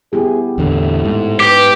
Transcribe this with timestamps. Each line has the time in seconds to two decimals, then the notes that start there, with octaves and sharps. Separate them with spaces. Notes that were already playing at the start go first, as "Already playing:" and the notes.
0.13 B3 E4 G4 G#4
0.58 E2 A2 D3
1.05 G#2
1.40 G4 B4